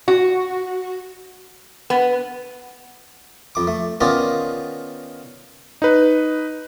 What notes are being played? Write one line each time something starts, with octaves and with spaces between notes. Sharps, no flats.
F#4
B3
F2 D6
A3
D#3 B3 C#4 F4 A#4 D5
D#4 B4